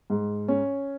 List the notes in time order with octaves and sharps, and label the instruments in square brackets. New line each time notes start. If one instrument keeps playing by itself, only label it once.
[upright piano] G#2
C#4